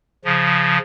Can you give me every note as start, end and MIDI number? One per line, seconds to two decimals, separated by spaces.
0.25 0.78 49
0.25 0.78 53